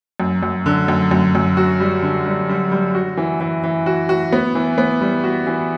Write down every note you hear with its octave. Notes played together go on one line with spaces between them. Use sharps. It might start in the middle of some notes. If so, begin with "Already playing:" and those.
F#2
F#2
D3
F#2
F#2
F#2
F#4
G3
D3
G3
G3
G3
F#4
E3
E3
E3
F#4
F#4
B3
E3
B3
G3
F#4
E3